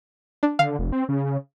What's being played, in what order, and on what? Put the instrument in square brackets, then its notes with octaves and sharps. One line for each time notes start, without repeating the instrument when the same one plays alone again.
[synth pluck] D4
[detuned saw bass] D3 [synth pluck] F5
[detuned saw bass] F1
C4
C#3